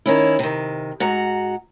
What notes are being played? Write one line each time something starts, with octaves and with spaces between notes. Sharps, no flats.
D#3 C#4 E4
C3 D#3
G#2 F#4 F#5 A#5